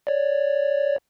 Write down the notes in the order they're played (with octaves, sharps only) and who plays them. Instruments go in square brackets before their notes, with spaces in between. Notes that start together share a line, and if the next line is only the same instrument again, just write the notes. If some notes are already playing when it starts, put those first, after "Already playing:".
[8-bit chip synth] C#5 D5